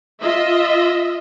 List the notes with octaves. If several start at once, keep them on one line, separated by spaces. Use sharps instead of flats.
F4 D#5 E5